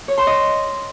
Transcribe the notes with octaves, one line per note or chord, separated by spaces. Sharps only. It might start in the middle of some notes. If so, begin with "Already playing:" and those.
C#5
C6
D#5